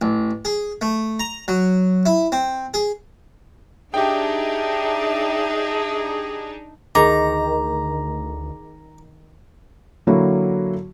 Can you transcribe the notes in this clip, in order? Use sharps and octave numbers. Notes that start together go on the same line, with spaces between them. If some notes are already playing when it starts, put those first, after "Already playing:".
A1
G#4
A3
A#5
F#3
E4
C4
G#4
D4 D#4 G4 G#4 E5 G5
D2 D#3 G#4 A#5 D6
D3 F#3 A#3 E4 F#4